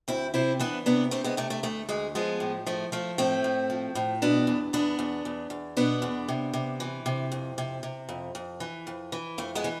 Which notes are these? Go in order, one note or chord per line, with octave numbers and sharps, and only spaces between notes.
D2 C4 E4
C3 C4 E4
E3 B3 D4
C3 B3 D4
C3 A3 C4
G#3 B3
C3 A3
A3
D2 A3
D2 G#3
F3 G#3 B3
A2
F3 A3
F3 A3
A2 A3 C4
A2
F3
A2
B2 B3 D4
E2
E2 B3 D4
E2
E2
E2
B2 B3 D4
E2
C3
C3
E3
C3
F2
C3
C3
F2
F2
E3
F2
E3
F2 A3
G#3 B3
E3